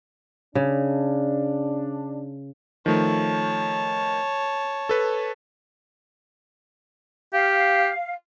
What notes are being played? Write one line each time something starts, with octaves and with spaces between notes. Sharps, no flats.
C#3 D4
D#3 F3 A3 C#5 A5
A4 B4
G4 F5